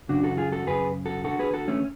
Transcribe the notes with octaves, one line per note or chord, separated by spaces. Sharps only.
F#2 C#3 D4 F#4
F#4 A4
F4 G#4
F#4 A4
F#2 C#3 G#4 B4
F#4 A4
D2 D3 F#4 A4
G#4 B4
F#4 A4
A3 C#4